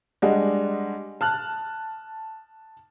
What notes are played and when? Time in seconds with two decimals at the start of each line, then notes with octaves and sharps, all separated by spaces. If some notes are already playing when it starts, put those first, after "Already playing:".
0.22 G3 G#3 D4 D#5 F#5
1.21 A5 F6 F#6